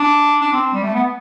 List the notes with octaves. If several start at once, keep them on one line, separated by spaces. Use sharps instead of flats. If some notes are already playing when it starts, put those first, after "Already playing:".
Already playing: D4
D4
C4
G3
A3
B3